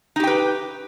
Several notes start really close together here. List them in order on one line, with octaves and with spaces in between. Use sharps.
D#4 G4 G5 B4